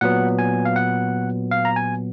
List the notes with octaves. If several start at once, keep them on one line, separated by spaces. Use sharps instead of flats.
A#2 F#3 B3 F#5
G#5
F5
F#5
F5
A#5
G#5